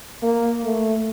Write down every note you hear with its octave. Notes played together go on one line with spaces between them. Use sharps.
A#3
A3